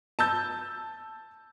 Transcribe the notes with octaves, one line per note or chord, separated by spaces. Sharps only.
A5 E6 G6